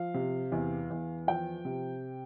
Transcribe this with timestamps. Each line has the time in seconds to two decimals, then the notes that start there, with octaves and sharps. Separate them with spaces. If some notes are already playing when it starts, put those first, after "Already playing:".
Already playing: F3 F5
0.14 C3
0.52 E2
0.90 E2
1.27 F3 G5
1.65 C3